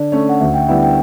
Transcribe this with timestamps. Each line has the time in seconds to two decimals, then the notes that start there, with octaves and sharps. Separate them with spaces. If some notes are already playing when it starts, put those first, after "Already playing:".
Already playing: D3 D5
0.12 A3 C#4
0.29 F#5
0.40 D2 E5
0.54 G5
0.68 D3 G3 B3 E4 F#5
0.83 G5